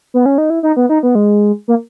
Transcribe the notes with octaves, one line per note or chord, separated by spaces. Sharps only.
B3
C#4
D#4
E4
D#4
B3
D#4
B3
G#3
A#3